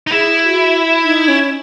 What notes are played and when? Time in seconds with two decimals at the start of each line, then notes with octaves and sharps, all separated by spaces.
0.07 D#4
0.11 E4 G#4
0.46 F#4
1.05 D#4
1.28 C#4